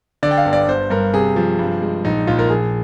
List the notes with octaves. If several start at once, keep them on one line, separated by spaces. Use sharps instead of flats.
D3 D5
G5
F5
G1
D5
G1 C5
G2 A#4
C3 G#4
F3
G2
G#3
A#1 D#4
A#1 F4
A#4
A#1 G#4